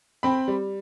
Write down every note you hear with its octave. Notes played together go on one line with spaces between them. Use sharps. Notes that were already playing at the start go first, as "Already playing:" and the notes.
C4 G5 B5
G3